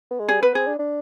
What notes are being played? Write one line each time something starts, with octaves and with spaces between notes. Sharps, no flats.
B3
G#3
G3 G#4
B3 B4
C4 G#4
D4
D4